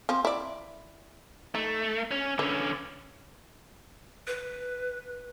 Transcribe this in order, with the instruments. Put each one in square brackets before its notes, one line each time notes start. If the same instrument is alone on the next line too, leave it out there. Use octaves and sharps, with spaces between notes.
[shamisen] F3 C4
E4 D5
[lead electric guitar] A3 [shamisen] D#4
[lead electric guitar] C#4
[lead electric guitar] D3 C#4 [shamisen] B4
[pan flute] B4